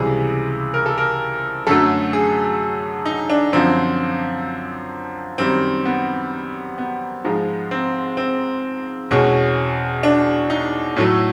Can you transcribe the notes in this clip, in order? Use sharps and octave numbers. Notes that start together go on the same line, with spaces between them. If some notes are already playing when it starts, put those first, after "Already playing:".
Already playing: C#2 C3 E3 G3 G#4
A#4
A4
A#4
F#2 D3 F#3 A3 A4
G#4
D#4
D4
F#2 D3 F3 C4
F#2 D#3 G3 C4
B3
B3
G#2 F3 G#3
C4
C4
E2 B2 G#3 C#4
D4
D#4
A2 F#3 A3